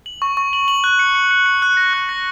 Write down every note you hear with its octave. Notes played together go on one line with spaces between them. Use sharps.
F#7
C#6
C#6
F#7
F#7
F#6
C#7
C#7
C#7
C#7
F#6
A#6
F#6
A#6